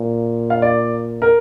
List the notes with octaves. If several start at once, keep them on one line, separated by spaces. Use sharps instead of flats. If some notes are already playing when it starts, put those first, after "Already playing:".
Already playing: A#2
F5
D5
A#4